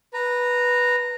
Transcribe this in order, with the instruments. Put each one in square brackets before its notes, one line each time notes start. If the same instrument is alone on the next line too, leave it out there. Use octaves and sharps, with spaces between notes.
[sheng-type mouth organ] B4 A#5